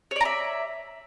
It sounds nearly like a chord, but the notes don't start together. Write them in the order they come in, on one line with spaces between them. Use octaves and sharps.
C#5 D5 A#5 E5